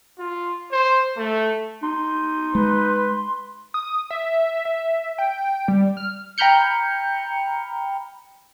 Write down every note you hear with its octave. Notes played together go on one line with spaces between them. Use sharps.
F4
C5
A3
D#4 C6
G#3 B4
D#6
E5
E5
G5
G3
F6
G5 A#5 B5 F6 G6 C#7